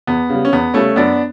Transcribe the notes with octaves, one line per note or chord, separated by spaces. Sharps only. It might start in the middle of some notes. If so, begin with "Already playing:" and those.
E2 B3
C#3 G3
C#4
E2 B3
C#3 G3 A3 C#4
F#2 B3 D4